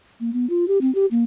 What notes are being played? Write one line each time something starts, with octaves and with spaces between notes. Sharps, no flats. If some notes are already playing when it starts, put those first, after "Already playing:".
A#3
B3
F4
G4
C4
G4
A#3